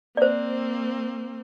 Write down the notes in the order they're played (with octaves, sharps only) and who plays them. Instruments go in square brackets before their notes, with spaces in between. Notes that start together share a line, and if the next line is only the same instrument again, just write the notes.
[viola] A#3 C4 [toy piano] C5 D5